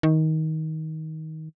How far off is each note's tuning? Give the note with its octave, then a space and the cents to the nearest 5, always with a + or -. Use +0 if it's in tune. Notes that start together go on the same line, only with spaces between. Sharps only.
D#3 +20